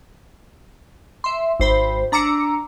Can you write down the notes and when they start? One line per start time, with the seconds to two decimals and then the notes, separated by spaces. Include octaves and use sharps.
1.24 E5 C6
1.60 G#1 C5 B5
2.12 D4 A#5 D6 E6 C#7